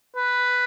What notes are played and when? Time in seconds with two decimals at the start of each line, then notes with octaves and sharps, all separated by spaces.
0.16 B4